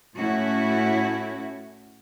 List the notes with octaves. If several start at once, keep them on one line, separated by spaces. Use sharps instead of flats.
A2 A3 C#4 E4 F#4